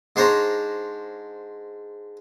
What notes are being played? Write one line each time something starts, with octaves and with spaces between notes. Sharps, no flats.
G#2 D4 C5 C#5 A#5